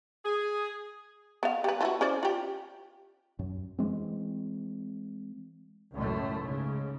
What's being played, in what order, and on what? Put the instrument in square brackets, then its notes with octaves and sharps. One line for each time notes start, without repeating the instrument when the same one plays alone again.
[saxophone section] G#4
[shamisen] B3 F5
G3 B4
F3 E4 F#4
C#4 C5 D5
F4 G4
[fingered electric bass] F#2
E3 F#3 G#3 C4
[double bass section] C#2 F#2 A2 A3
G#2 C#3